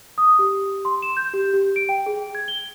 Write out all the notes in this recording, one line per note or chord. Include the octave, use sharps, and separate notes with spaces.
D#6
G4
C6
E7
G6
G4
G4
D7
G5
G#4
G#6
G7